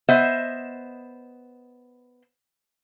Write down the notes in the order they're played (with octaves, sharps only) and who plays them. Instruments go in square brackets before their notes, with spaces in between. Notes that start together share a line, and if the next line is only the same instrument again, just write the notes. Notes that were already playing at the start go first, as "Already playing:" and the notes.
[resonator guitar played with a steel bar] B3 C5 D#5 E5